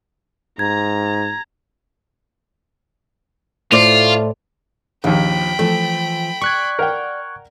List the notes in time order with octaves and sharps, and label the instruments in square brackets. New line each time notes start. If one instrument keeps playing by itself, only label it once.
[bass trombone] G#2 [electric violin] A#5 [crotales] G#6
[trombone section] A2 A3 [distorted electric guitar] F4 [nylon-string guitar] C5 D5
[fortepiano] A#1 D#2 [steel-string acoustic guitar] F3 [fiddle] G5 B5
[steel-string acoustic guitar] E3 F3 [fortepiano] A3
[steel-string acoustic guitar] D5 [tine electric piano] C#6 F#6 G#6
[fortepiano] A#4 F#5 G5